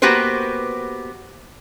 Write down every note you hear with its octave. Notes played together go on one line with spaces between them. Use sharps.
A#3 B3 F#4 G4 B4 C5